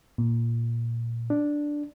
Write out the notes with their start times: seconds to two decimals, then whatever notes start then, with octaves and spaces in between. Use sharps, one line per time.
0.18 A#2
1.30 D4